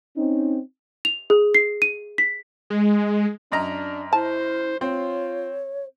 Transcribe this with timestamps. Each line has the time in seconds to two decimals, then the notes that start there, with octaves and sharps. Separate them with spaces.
0.17 C4 C#4 D#4
1.05 F7
1.30 G#4
1.55 C7
1.82 D#7
2.18 B6
2.70 G#3
3.52 F#2 D4 D#5 A#5
4.13 E4 C5 A5
4.81 C4 F4 C#5